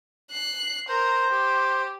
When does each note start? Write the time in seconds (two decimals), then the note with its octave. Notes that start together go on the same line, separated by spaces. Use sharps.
0.31 F#6 C7
0.88 A#4 C5 A#5
1.30 G4